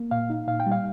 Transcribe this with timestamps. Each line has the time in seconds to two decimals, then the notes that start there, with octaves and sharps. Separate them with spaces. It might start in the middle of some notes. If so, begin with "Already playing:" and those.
Already playing: A#3
0.11 A#2 F5
0.30 D#4
0.48 A#2 F5
0.60 G5
0.66 G3
0.72 F5